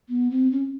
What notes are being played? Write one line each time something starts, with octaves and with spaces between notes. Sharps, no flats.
B3
C4
C#4